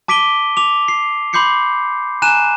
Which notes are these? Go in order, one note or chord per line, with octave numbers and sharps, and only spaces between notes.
A5 D6 B6 D7 D#7 G7
D6 F7
C7
B5 C6 D6 G6 C7 C#7
G#5 A#5 F#6 D#7 E7